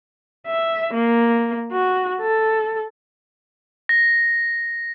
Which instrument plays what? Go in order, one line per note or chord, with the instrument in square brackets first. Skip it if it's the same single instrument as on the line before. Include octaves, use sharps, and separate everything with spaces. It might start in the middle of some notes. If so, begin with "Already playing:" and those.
[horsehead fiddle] E5
A#3
F#4
A4
[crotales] A#6